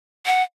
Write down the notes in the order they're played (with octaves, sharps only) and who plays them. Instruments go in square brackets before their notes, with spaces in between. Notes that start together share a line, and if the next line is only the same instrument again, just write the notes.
[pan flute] F#5